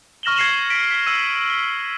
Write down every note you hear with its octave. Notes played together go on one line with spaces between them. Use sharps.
C#6 F6 A#6 E7 F#7 G7
G#6 A#6 C7 C#7 E7 F#7
B6 D7
B6 G7
E6 C7 D#7
G7